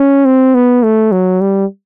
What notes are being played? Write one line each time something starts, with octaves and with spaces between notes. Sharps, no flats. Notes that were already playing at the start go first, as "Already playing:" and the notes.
Already playing: C#4
C4
B3
A3
F#3
G3